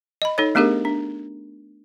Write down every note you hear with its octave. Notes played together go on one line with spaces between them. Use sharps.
D#5 B5
D#4 A4 C#5
A3 B3 D4 G4 G#4 A#4
D4